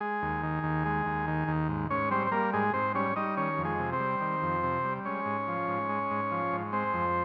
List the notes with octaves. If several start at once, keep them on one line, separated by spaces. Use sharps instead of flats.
G#3 G#4
D#2
D#3
D#2
G#3
D#2
D#3
D#2
G#2
G#2 C#4 C#5
G3 C4 C5
C5
G3 A#3 A#4
G#2 G#3 G#4
G#2 C4 C5
G3 C#4 C#5
G3 D#4 D#5
D#3 C#4 C#5
F2
G#3 G#4
C3
C4 C5
G3
D#3
F2
C3
G3
G#3 C#4 C#5
G#2
F3
G#2
G#3
G#2
F3
G#2
G#3 C4 C5
F2